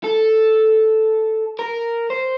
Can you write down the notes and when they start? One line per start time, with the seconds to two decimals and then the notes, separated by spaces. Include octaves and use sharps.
0.04 A4
1.59 A#4
2.10 C5